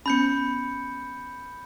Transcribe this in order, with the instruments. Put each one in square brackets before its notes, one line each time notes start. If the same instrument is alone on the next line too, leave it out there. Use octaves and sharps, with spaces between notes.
[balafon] B3 C#4 [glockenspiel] B5 G6 C#7